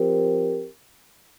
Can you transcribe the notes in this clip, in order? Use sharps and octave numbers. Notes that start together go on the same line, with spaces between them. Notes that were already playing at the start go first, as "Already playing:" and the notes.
Already playing: F3 C4 G4 A#4